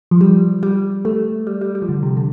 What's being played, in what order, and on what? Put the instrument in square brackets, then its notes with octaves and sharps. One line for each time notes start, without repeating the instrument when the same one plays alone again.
[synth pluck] F3
G3
G3
A3
G3
G3
G3
F3
D3
C3
D3